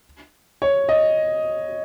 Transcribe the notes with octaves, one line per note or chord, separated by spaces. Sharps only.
C#5
D#5